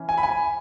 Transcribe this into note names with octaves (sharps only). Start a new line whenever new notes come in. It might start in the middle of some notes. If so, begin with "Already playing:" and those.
Already playing: E3 C#4
G#5
B5
G#5